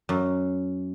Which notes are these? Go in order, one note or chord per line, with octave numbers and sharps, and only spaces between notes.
F#2